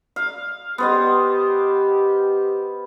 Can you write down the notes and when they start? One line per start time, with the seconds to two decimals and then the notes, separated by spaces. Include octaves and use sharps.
0.16 F5
0.78 B3 G4 C5 D#5